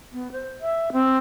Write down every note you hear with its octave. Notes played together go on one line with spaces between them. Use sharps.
B3
C5
E5
C4